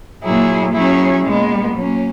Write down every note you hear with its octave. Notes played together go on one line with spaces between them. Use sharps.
A#2 F#3 A#3 E4 G#4
F#3 C#4 E4 G#4
A#2 G#3 B3
F#3 A#3 C#4